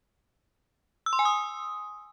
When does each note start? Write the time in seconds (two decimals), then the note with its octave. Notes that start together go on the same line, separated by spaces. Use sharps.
1.06 E6
1.13 C6
1.19 G#5
1.25 D#6